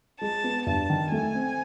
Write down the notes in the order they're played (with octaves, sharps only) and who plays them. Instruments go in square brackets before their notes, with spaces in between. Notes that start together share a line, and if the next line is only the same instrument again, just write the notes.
[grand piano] G#3 [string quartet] A5
[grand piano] B3
[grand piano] G2 [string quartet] A5
[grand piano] D#3
[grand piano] A3 [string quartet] G#5
[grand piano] C4